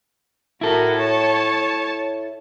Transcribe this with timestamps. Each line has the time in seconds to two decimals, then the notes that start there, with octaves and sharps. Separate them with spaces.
0.61 E4 F#4 A4 A#4
0.96 C#5 A5